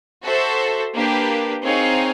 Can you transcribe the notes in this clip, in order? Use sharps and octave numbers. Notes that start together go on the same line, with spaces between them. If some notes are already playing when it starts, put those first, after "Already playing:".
F#4 A4 C5 E5
A#3 D4 G4 B4
C4 D#4 G#4 C#5 F5